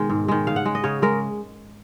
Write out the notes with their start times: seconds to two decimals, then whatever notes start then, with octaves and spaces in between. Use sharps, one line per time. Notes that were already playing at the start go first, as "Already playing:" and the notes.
Already playing: B2 D#3 G#3
0.10 G#2
0.28 D#3 G#3
0.47 C#3 F5
0.56 F#5
0.65 G#3
0.75 D#5
0.84 C#3 C#5
1.02 G#3 A#4